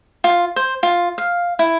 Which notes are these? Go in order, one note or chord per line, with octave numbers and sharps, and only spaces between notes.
F4
C5
F4
F5
E4